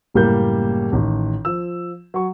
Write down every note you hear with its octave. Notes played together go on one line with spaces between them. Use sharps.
F#1 A2 G3 A#3 G6
A1 D#3
F3 E6
F#3 C#6